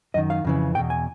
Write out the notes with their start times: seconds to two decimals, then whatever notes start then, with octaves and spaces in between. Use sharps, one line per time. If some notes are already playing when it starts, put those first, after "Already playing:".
0.14 F#2 D#3 D#5
0.30 F5
0.44 F2 C#3 E3
0.75 E2 B2 G5
0.90 G#5